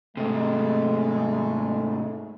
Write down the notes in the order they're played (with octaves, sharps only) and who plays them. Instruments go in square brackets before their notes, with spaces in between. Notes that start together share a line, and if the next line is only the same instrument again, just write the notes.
[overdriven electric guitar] G#2 C3 [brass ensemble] G#3 A3